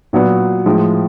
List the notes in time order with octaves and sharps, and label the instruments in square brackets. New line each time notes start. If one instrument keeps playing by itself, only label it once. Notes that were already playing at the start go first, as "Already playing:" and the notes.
[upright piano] A#2 F#3 B3
A2 F3 G#3